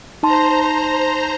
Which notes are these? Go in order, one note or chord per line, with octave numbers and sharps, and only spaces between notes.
D#4 C5 A5 A#5 C6